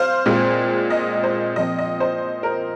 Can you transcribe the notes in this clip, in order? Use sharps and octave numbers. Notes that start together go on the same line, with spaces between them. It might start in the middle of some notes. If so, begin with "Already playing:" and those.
Already playing: C5 F5
A#2 G#3 C4
D#5
C5
A#2 F3 C4 D#5
D#5
C5
A#4